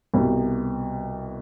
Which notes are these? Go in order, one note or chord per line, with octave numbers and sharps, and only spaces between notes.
C2 B2 G3